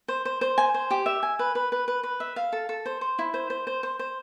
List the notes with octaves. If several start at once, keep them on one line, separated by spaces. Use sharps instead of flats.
C5
C5
C5
G#5
C5
G4
E5
G#5
B4
B4
B4
B4
B4
E5
F5
A4
A4
C5
C5
E4
C5
C5
C5
C5
C5